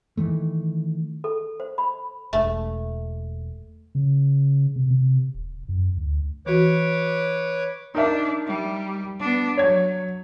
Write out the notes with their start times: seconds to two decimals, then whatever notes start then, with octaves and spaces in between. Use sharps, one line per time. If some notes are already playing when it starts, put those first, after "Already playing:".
0.17 D#3 E3 A3
1.24 A4
1.60 C5
1.78 B5
2.33 E1 A3
3.95 C#3
4.76 C3
4.91 C3
5.34 D#1
5.69 F#2
5.97 D2
6.46 E3 F#4 B4 C#5 D6
7.95 D4 D#4 A#4 E5
8.47 G3
9.19 B3 D4
9.57 F#3 C#5 G#6